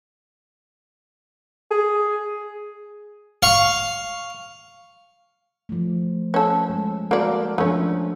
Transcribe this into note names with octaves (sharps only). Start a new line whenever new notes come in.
G#4
F5 C#6
F3 A3
C#4 A4
G#3
A#3 F#4 A4 A#4 D5
F3 A3 C#4 D4